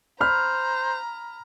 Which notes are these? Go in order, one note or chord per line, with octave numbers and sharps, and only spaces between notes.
C5 A#5 B5 F6